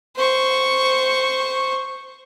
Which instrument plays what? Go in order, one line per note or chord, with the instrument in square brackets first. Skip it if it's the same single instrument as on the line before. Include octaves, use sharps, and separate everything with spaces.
[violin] C5 C#6